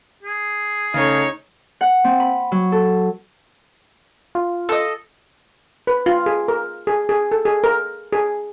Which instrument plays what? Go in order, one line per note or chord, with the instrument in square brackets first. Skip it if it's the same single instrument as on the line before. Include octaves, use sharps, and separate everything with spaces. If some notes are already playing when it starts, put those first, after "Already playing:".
[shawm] G#4
[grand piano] C#3 A3 [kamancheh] D#4 C#5
[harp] F#5
C4
B5
F#3
A4
[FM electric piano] F4
[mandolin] A4 D#5
[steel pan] B4
F4
G#4
A#4
G#4
G#4
A4
G#4
A#4
G#4